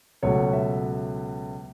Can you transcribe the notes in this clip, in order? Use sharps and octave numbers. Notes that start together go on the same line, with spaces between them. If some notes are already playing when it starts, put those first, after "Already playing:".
C#2 B2 F#3 A3 C#5
E5